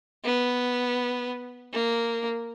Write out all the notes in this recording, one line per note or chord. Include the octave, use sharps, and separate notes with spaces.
B3
A#3